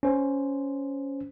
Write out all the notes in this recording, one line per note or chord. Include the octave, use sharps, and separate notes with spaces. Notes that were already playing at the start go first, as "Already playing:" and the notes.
C#4 C5